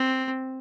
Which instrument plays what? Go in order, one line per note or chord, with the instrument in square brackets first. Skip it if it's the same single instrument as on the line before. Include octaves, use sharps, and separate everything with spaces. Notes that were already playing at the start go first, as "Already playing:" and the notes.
Already playing: [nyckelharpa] C4